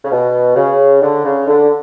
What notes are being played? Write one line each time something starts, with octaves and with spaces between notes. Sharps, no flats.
C#3
B2
C#3
D3
C#3
D3